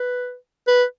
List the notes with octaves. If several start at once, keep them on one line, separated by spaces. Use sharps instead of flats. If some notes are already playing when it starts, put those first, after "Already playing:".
Already playing: B4
B4